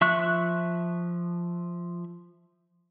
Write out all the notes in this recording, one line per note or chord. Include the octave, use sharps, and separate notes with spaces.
F3 E5 C#6 F#6